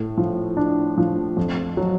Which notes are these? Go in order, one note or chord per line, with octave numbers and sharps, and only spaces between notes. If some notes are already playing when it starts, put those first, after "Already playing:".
Already playing: A2
F3
D4
F3
F2
F#3